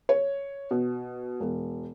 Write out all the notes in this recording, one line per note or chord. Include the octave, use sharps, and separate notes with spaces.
C#5
B2
E1